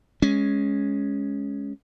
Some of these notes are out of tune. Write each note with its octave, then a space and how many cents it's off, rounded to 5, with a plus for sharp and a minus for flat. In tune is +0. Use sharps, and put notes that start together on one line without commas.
G#3 +0 C#4 +0